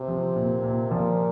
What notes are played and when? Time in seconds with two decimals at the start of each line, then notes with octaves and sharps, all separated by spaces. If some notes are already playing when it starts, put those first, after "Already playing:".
Already playing: C3
0.08 F3
0.36 A#2
0.64 A#2
0.91 A#2 F3